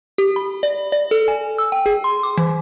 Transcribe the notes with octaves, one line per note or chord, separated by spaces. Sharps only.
G4
B5
D5
D5
A4
G#5
E6
G5
G#4
C6
D6
E3